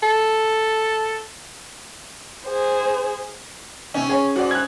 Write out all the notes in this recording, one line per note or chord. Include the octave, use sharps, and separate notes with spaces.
A4
G#4 C5
C3 C#4 D#4
G#4 C#5
G#2 F#4 D5
F#6 G#6